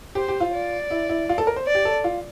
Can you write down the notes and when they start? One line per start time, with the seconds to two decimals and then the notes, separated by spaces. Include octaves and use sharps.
0.15 G4 C5
0.28 G4
0.40 F4
0.54 D5
0.91 E4
1.09 E4
1.29 F4
1.38 A4
1.47 A#4
1.56 C5
1.67 D5
1.75 G4
1.85 A4
2.04 F4